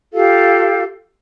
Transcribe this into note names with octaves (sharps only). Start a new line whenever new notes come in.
F4 G4 A4 F5